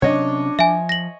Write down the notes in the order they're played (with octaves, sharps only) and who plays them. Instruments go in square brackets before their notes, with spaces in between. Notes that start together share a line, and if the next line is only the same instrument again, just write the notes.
[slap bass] C3 F#3 C#4 [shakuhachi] D4 [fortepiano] C#5 D#5
[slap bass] F3 [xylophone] E5 G#5
[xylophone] A#6 F#7